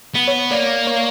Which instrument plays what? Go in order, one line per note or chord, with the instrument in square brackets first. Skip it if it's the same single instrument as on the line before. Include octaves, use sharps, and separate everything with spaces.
[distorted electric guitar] B3
[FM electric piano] C#5
[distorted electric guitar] A#3 [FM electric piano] D5
[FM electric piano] C#5